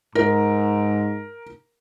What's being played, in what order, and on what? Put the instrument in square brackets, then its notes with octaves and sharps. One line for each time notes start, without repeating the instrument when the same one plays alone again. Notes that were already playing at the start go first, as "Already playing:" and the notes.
[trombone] G#2 [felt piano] A#4